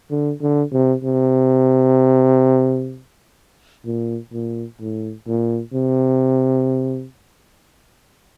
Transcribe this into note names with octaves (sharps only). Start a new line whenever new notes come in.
D3
D3
C3
C3
A#2
A#2
A2
A#2
C3